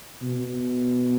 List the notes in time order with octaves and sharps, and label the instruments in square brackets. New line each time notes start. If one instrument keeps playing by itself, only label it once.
[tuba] B2